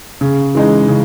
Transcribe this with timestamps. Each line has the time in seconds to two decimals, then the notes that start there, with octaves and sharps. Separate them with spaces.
0.21 C#3
0.55 E3 G#3 D#4
0.88 C#3